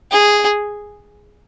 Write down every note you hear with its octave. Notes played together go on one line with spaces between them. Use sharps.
G#4